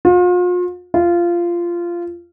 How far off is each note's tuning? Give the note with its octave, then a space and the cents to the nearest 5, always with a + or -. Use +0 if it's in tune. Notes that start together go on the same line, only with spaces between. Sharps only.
F4 +40
F4 -15